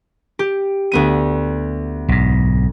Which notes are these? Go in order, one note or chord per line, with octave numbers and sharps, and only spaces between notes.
G4
D2 B3 D#7
B1 G#2